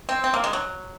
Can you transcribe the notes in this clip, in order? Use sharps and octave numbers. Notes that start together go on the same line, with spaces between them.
C4
C4
A#3
G#3
F#3